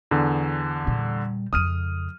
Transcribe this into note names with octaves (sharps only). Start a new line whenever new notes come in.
E2 D3
A#2 G3
F2 C#3 D#6 F6 D#7